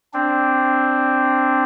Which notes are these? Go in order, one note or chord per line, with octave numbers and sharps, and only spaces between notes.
C4 D4